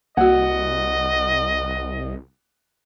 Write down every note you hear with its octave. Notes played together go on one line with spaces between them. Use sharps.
C2 A#3 F#4 D#5 F#5